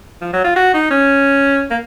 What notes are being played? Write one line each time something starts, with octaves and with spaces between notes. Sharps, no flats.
F3
F#3
F4
F#4
D#4
C#4
A#3